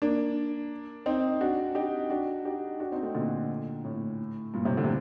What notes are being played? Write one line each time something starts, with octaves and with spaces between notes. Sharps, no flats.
A#3 D4
C4 D#4
D4 F#4
D#4 G4
D4 F#4
D#4 G4
D4 F#4
C4 D#4
A3 C4
A#2 D3
A2
G2 A#2
A2 C3
A#2 D3
C3